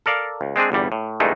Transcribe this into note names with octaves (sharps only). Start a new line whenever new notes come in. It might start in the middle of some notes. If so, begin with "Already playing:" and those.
A4 A#4 D5 F5
C#2
G#3 C4 D4 G#4
G1 E2 G3
A2
E2 G2 A#2 G#3 A3 D#4